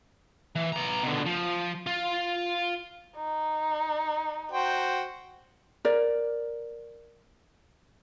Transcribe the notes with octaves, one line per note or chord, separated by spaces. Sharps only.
E3
B3 A#5
B2 D3
F3
F4
D#4
F#4 C5 G5
A#4 D5